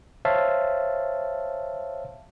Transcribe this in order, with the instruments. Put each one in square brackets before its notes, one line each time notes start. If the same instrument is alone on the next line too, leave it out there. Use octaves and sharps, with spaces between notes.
[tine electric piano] C5 C#5 E5 F5 A5